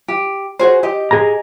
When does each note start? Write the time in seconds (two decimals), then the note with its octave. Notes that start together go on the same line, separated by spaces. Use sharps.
0.08 G4
0.59 F#4 G#4 C5
0.83 G4 D#5
1.11 G#4 A#5